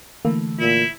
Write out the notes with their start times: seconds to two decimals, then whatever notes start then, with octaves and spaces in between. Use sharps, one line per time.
0.25 D3 E3 A3 A#3
0.60 A#2 E4